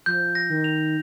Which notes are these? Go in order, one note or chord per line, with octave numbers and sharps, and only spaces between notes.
F3 G6
A#6
D#3
F7